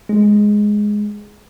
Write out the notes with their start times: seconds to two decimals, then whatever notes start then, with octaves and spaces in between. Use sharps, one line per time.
0.09 G#3